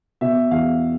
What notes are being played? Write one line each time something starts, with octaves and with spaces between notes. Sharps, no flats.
B2 E5
E2 F5